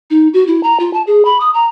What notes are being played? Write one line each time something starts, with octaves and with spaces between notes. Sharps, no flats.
D#4
F#4
E4
A#5
F4
A5
G#4
B5
D#6
A#5